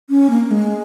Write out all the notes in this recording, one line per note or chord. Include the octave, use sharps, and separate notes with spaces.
C#4
A#3
G#3